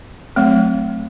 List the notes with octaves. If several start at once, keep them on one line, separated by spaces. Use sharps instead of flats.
F#3 A3 C4